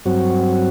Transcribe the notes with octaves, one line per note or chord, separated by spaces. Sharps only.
G2 F#3 C4 F#4